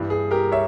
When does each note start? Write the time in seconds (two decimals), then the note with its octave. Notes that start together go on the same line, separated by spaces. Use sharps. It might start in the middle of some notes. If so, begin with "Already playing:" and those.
Already playing: G2 E3 G3
0.10 G#4
0.31 G4 A#4
0.52 C#5 E5